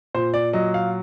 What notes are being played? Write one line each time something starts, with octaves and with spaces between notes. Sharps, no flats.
A#2 C5
D5
F#3 D#5
F5